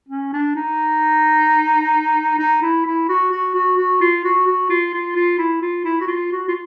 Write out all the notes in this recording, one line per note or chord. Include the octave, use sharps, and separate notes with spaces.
C#4
D4
D#4
D#4
E4
E4
F#4
F#4
F#4
F#4
F4
F#4
F#4
F4
F4
F4
E4
F4
E4
F#4
F4
F#4
F4